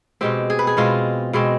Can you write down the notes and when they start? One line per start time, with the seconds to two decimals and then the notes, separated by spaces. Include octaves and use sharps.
0.21 B2 G#3 C4 G4
0.50 G#4
0.59 B4
0.67 G#4
0.77 B2 G#3 C4 F4
1.33 B2 G#3 C4